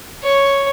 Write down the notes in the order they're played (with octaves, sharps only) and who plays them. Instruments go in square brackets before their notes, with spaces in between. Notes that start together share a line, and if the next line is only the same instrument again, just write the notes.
[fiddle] C#5